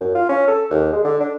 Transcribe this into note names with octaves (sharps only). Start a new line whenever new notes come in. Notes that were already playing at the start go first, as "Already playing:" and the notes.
F#2
F4
C#4
A4
D#2
G#3
D3
D4